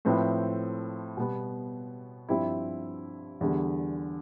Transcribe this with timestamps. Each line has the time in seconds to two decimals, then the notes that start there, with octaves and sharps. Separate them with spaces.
0.05 A2 F3 C4 E4 B4
1.17 B2 G3 B3
2.29 G2 F3 C4 E4 G4
3.41 E2 D3 G3